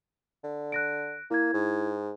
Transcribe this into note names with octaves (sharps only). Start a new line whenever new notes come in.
D3
F#6 A#6 D7
A#3 E4 G#6
G#2